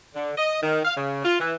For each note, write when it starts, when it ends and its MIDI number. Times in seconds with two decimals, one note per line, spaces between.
0.15 0.32 50
0.38 0.58 75
0.63 0.81 51
0.85 0.97 77
0.97 1.24 49
1.25 1.36 65
1.40 1.54 52